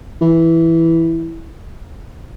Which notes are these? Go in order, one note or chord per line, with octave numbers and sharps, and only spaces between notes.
E3